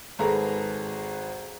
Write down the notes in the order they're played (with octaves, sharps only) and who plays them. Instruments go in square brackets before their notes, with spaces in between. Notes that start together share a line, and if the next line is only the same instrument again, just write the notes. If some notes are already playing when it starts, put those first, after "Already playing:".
[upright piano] G#1 G#4 A4 B4 A#5